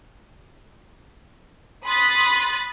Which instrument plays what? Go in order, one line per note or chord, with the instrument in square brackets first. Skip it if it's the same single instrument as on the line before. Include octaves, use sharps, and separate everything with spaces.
[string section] B5 C6 D#6 F#6 A6 B6